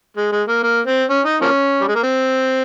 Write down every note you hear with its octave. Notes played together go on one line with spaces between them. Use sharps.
G#3
G#3
A#3
A#3
C4
C#4
D#4
F3 A#3 C#4
G3
G#3
A#3
C4